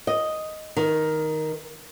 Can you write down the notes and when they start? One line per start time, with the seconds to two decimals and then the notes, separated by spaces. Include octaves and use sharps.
0.07 D#5
0.77 D#3